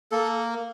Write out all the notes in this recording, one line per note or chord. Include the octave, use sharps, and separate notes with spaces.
A#3 A4